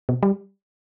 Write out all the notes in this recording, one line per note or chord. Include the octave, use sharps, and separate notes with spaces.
B2
G3